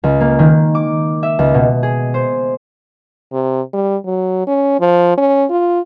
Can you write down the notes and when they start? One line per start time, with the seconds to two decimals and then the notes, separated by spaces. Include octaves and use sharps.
0.04 C#2
0.21 A#3
0.39 D#3
0.75 D6
1.23 E5
1.39 C#2
1.54 B2
1.83 G#4
2.14 C5
3.32 C3
3.74 G3
4.05 F#3
4.47 C#4
4.80 F3
5.18 C#4
5.50 F4